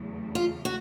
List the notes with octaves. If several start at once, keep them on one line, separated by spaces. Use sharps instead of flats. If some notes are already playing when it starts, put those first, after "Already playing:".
Already playing: E2 C#3 F#3 A3
F4
F#4